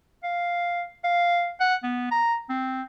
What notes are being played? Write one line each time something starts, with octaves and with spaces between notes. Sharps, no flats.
F5
F5
F#5
B3
A#5
C4